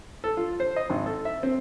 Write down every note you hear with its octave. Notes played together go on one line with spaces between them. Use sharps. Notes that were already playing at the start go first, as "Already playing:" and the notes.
A4
F4
C5
D#5
G#1
A4
E5
C4